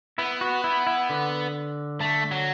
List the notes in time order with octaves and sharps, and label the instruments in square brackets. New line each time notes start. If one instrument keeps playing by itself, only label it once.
[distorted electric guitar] B3 [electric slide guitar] E4
[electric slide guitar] F#4
E4
E4
D3
[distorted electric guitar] A3
F#3